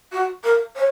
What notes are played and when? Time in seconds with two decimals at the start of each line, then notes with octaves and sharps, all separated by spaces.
0.11 F#4
0.43 A#4
0.75 C#5